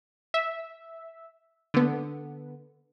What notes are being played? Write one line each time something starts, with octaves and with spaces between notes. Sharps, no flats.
E5
D3 B3